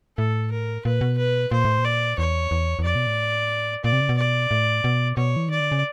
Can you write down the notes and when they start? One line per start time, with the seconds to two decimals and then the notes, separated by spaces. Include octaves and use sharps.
0.18 A2 A4
0.51 A#4
0.85 A#2 B4
1.01 B2
1.18 B4
1.51 A#2 C5
1.65 A2
1.78 A#2
1.85 D5
2.18 E2 C#5
2.51 E2
2.79 E2
2.84 F2 D5
2.95 B2
3.07 A2
3.84 A#2 D5
3.92 C3
4.01 C#3
4.09 B2
4.18 D5
4.51 A2
4.84 B2
5.17 B2 C#5
5.36 E3
5.48 D#3 D5
5.60 D3
5.72 C#3